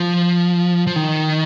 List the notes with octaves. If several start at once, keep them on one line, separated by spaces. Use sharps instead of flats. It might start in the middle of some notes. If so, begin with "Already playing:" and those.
Already playing: F3
F3
D#3